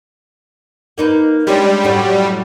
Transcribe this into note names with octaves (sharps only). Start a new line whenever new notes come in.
A#3 D#4 B4
G3 G#3 C#4 D4
F#2 A2 F#3